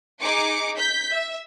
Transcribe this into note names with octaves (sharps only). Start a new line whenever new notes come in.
D#4 G#4 D6 C#7
G6 B6
E5